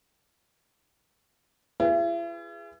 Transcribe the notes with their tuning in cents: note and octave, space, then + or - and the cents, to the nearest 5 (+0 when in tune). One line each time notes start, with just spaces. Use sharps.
E4 +45 G#4 -15 B4 +0